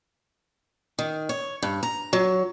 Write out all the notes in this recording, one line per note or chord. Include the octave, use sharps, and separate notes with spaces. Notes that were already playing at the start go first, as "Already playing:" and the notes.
D#3
C#5
G2
A#5
F#3